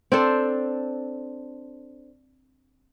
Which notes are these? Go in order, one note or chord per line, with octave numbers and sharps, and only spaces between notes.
C4 D4 A4 C5